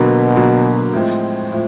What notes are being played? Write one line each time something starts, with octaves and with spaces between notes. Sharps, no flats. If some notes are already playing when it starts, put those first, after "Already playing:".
Already playing: B2 D3 F#3 A#3
D3 F#3 A#3
A2 F3 G#3 C4
A2 F3